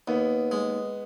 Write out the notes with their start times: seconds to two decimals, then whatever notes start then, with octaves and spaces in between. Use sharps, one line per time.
0.08 D#2 B3
0.51 G#3